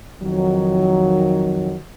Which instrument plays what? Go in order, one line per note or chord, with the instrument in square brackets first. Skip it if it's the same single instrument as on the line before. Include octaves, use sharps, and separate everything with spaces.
[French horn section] F2 D#3 F#3